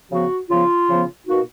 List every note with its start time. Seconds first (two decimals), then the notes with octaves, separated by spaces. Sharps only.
0.10 C#3 F3 B3 F#4
0.49 C#3 F3 B3 F4
0.88 C#3 F3 B3
1.26 B2 A#3 D#4 F#4